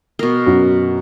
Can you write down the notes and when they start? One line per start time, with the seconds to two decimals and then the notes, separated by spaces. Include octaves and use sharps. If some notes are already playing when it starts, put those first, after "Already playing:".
0.19 B2 A#4
0.46 F#2